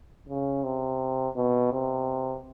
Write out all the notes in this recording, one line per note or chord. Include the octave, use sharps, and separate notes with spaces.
C#3
C3
B2
C3